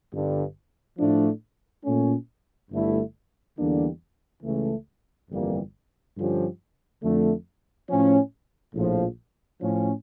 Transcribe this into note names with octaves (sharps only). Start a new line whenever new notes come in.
G1 G2 D3
A2 F3 A3 D4
A#2 A3 C#4
G1 G2 D3 A3 E4
E2 D3 G3 A#3 D4
C#2 C#3 E3 A3
G1 F2 E3 G3 A#3
G2 D3 F3 C#4 G4
F2 D3 A3
A2 F3 C#4
A#1 A2 F3
A2 F3 C#4